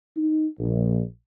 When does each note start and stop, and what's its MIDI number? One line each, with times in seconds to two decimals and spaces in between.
0.17 0.47 63
0.59 1.01 34